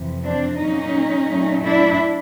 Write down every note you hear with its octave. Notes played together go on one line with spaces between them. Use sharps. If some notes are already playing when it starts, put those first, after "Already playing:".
Already playing: F2 C3 E3
C4 D4
A#2 F#3 A#3 C#4 D#4
A#2 F#3 A3
D4 E4